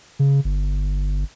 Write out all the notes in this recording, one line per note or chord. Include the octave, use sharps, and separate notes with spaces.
C#3
G1